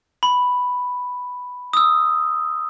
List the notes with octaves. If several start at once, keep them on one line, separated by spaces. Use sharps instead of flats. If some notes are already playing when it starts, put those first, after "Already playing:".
B5
D#6 E6